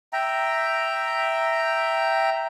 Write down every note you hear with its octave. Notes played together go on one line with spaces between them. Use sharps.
E5 G5 A#5